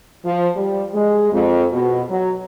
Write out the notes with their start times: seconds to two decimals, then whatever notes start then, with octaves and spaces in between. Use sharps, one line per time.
0.25 F3
0.56 G3
0.94 G#3
1.33 F2
1.72 B2
2.10 F#3